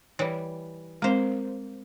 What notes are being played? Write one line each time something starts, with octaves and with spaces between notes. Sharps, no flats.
E3 G3 C#5
G#3 A#3 C4 C5